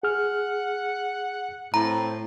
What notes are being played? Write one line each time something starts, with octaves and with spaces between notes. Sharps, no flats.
G#4 F#5 F6
A2 C4 A#5